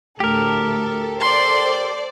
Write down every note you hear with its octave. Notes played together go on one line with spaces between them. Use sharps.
D2 A2 G4 A4 A#4
A4 C5 D5 C6